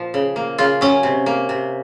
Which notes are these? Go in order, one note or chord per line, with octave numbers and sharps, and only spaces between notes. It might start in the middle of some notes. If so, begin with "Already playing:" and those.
Already playing: A#2 F3
C#3
A#3
C#3 F4
F#3 C#4
C3
A#3
C3